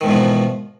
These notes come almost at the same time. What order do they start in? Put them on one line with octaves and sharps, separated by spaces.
D#3 G#2 E2 B2 F3